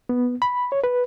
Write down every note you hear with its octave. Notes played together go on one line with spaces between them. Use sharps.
B3
B5
C#5
B4